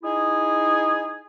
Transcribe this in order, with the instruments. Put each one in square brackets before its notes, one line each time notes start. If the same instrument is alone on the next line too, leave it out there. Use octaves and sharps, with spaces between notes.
[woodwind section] D#4 E4 G#4